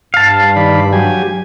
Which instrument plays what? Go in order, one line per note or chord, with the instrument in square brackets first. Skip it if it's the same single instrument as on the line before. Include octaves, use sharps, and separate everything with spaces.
[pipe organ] G2 [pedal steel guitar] F5 A5
[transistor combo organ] D#3 D5 B5
F#3 G4 G#5